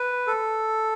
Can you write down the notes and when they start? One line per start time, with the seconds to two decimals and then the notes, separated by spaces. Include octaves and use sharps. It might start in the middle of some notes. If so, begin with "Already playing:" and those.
Already playing: B4
0.27 A4